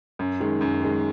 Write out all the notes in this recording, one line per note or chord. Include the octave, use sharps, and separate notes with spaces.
F#2
D#3 G#3
F#2
D#3 G#3